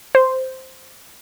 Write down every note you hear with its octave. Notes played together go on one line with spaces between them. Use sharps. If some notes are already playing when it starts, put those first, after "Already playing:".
C5